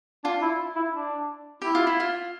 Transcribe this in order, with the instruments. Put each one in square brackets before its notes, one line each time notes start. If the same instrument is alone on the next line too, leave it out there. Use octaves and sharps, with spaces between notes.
[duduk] D4 [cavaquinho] F4
[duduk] E4
E4
D4
[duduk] E4 [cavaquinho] G4
[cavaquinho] F4
E4
F4